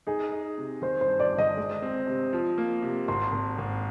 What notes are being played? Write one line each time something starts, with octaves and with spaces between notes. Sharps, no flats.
D#4 G#4
D#4
C3
D#3 C5
C5
G2
D5
G1
D#5
G#3
C4
C3
F3
A#3
C3
G#1 C6
G#1
G#1